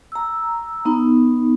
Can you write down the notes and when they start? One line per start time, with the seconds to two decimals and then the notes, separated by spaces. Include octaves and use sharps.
0.12 A#5 E6
0.85 B3 D#4